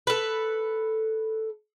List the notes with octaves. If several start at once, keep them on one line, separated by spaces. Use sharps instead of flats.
A4 B4